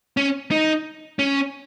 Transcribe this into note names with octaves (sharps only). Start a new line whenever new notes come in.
C#4
D#4
C#4